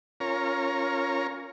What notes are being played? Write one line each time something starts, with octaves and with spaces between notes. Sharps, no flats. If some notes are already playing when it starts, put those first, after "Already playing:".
C#4 F4 A#4 C#5 A#5